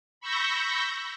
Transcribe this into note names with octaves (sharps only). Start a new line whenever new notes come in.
B5 C#6 E6 G6 A#6